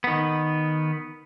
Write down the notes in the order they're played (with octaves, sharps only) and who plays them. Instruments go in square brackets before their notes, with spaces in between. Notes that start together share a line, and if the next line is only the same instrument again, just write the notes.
[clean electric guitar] D#3 B3